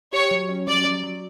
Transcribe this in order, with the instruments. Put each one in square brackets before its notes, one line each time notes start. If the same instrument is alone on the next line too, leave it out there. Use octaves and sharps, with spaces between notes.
[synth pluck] G4 [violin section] C#5
[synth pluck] F#3
C#4
[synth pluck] F#3 [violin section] D5
[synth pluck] F#3
F#3